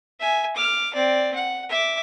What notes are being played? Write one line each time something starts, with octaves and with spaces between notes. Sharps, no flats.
E5 G#5
D6 F6
C4 D5
F#5
E5 D6